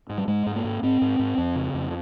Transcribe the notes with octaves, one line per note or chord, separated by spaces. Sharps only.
G#2
G3
G#2 G#3
G#2
A#3
G#2
G#2 C4
G#2
G#2
F2
C#3
F2